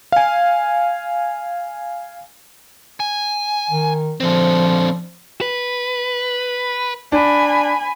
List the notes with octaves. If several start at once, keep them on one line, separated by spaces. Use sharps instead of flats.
F5 G#5
G#5
D#3
D3 F3 C4
B4
D4 G#5 B5